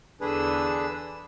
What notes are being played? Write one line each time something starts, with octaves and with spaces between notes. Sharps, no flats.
E2 D3 D4 G#4 B4 E6